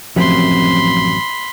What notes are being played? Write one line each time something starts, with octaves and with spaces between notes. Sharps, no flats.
A1 F#2 C3 F3 C4 B5 C6